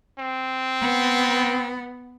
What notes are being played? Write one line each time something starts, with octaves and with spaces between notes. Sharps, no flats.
C4
B3